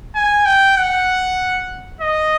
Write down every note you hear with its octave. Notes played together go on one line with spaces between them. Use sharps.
G#5
G5
F#5
D#5